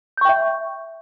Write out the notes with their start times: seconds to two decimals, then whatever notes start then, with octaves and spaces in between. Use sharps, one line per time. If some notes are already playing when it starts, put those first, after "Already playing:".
0.17 G6
0.21 C#6
0.25 G5
0.29 E5